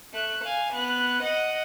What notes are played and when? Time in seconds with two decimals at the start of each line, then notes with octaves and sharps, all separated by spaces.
0.13 A3 F#6
0.44 F5 G#5
0.73 B3 F#6
1.23 D#5 F#5